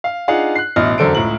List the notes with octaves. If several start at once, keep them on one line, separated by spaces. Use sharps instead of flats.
F5
D4 D#4 F4 G#4 F5 F#5
F#6 C7
A1 B2 D#5 E5 F6
E1 F#2 D3 A4 C5 D7
C#2 A2 A#5 F#7